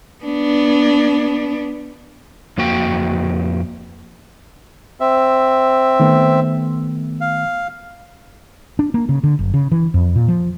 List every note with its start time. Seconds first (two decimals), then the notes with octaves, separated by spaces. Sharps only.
0.24 B3 D4
2.58 F2 A#3 F#4 G5
5.00 C4 E5
6.00 D#3 A3 B3
7.21 F5
8.79 D4
8.94 A#3
9.09 C#3
9.24 D3
9.39 F#1
9.54 C#3
9.72 E3
9.94 F2
10.16 A#2
10.28 F3